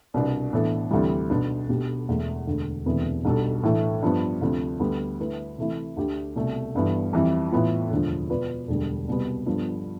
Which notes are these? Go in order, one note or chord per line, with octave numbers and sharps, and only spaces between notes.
C2 B2 B3 D4
A2 E3 B3 D4 A4
D2 C3 E3 G3
B1 B2 B3 D4
B1 B2 B3 D4 G4
E1 E2 D3 A3 E4
E1 D2 D3
E1 D2 C3 E3 B3
B1 B2 G3 D4 A4
A2 E3 A3 D4 A4
G2 F3 B3
D2 C3 F3
D2 D3 G3 B3
D3 A3 E4 B4
C3 E3 A3 E4
D2 D3 A3 D4 G4
C2 B2 A3
G1 G2 E3 B3
F2 E3 G3
A2 E3 B3 F4
E1 D2 D3 F3
B2 B3 F4 B4 D5
E1 D2 D3 G3
C2 B2 G3 B3
G1 G2 F3 B3